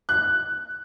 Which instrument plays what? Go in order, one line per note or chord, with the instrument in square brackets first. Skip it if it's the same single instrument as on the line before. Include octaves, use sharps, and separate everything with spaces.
[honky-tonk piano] F#6